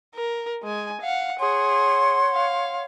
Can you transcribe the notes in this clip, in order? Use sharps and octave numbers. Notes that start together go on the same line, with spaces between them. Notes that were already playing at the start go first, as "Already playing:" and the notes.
A#4
G#3 G#5
F5 F#5
G#4 C#5 F#5 C6
F5